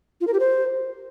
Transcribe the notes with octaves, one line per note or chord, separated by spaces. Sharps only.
F4
A#4
G4
C5